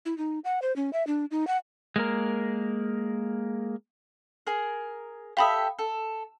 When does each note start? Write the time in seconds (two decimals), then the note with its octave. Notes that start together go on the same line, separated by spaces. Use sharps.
0.06 E4
0.18 D#4
0.44 F#5
0.62 C5
0.76 C#4
0.93 E5
1.07 D4
1.31 D#4
1.47 F#5
1.96 G#3 A#3 A#4
4.47 G#4 A#4
5.37 G4 A4 E5 F5 B5 D#6
5.79 A4